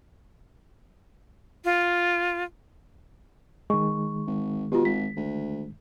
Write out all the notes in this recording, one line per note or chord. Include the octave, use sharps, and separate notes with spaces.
F4
D#3 G#3 C#6
G#1
B2 F4 G4
G#1 B6
D2